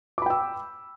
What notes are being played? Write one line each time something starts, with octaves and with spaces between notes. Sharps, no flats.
G5 B5 D6 E6